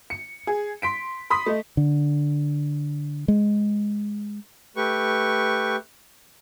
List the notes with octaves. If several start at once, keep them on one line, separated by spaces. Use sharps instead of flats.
C#7
G#4
C6 B6 D7
B5 C6 D#6 B6
A3 D#5
D3
G#3
A3 G4 B4 C#6